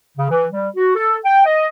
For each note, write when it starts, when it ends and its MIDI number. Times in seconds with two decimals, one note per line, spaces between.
0.17 0.29 49
0.30 0.46 52
0.52 0.70 55
0.77 0.95 66
0.96 1.17 69
1.25 1.45 79
1.45 1.68 75